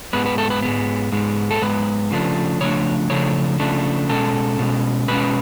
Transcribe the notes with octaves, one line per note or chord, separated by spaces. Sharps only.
G#2 G#3 B3 B4
B4
A4
B4
G#2 G#3 B3
G#2 G#3 B3
A4
G#2 G#3 B3 B4
C#3 F3 A3 D4
C#3 F3 A3 D4 C#5
C#3 F3 A3 D4 C#5
C#3 F3 A3 D4
B2 G#3 C#4 A4
B2 G#3 C#4
B2 G#3 C#4 B4